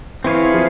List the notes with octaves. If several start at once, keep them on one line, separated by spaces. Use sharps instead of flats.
E3 C4 E4 G#4 C#5 F5
F3